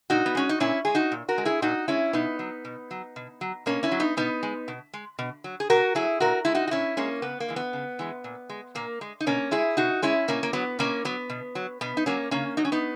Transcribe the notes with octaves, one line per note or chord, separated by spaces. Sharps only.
A#2 D#4 F#4
B3
G#3 C#4
D#4
A#2 C#4 E4
G#3 G#4
D#4 F#4
A#2
F#4 A#4
G#3
E4 G#4
A#2 D#4 F#4
G#3 C#4 E4
B2 B3 D#4
F#3
B2
F#3
B2
F#3
B2 A#3 C#4
C#4 E4
F#3
B3 D#4
B2 B3 D#4
G#3
B2
G#3
B2
F#3
G#4
B2 F#4 A#4
F#3 E4 G#4
A#2 F#4 A#4
G#3 E4
D#4 F#4
F#4
A#2 C#4 E4
G#3 A#3 C#4
C#3 B3
A#3
E3 G#3
B3
C#3
E3 G#3
A#2
G#3
A#2 A#3
G#3
D#4
B2 A#3 C#4
G#3 E4 G#4
B2 D#4 F#4
G#3 C#4 E4
B2 A#3 C#4
A#3
F#3 B3
B2 A#3 C#4
F#3 B3
B2
F#3
B2 B3
D#4
F#3 A#3 C#4
C#3 A#3 C#4
F#3 D#4
C#4
B3 D#4